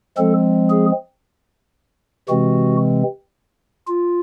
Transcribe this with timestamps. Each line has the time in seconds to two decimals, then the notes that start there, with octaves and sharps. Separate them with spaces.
0.17 F3 G#3 C4 A4
0.70 G#4
2.29 C3 E3 G#3 C4 F#4
3.87 F4